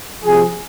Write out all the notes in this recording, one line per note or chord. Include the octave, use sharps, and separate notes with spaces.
C3 F3 G#4